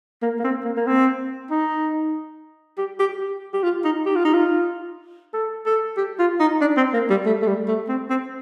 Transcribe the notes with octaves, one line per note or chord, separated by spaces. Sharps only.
A#3
A#3
C4
A#3
A#3
C4
D#4
G4
G4
G4
F4
D#4
G4
F4
D#4
F4
A4
A4
G4
F4
D#4
D4
C4
A#3
G3
A3
A3
G3
A3
C4
C4